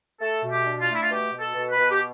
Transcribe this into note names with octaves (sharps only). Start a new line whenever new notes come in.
A3 A4
B2
G4
D4
F4
A3
E4
F4
B2 G4
B2
A4
B2
B4
B2
G4